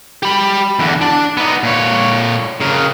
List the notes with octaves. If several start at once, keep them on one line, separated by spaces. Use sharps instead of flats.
G4 B5
E2 D3
D4
B3 D#4
A#2 C#5
C#3 A#4